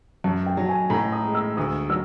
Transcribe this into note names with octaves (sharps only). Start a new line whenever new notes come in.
F#2 A5
G5
F#3
G#5
A2 A#5
D#6
G#3
E6
D2 D#6
F#3 E6